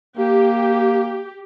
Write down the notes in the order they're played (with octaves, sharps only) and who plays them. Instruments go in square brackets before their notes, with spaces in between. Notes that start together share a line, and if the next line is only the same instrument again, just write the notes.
[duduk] A#3 [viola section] G4